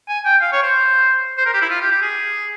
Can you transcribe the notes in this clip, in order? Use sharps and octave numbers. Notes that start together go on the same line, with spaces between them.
G#5
G5
F5
C#5
C5
C5
A#4
G4
E4
F4
G4
G4
G#4